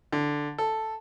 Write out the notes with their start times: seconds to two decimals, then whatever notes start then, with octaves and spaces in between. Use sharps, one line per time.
0.12 D3
0.58 A4